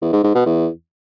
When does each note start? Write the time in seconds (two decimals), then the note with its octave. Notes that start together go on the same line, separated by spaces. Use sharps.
0.02 E2
0.13 G#2
0.24 G#2
0.35 B2
0.46 E2